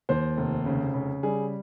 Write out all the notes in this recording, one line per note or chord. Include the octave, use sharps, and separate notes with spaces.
D#2 C5
F1
C#3
C#3
G3 G#4